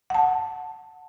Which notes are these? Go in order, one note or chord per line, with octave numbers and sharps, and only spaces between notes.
F#5 A5